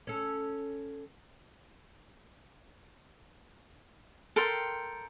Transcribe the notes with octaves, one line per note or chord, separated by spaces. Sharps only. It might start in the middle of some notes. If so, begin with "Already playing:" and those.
C#4 A4
A4 A#4 G5 C6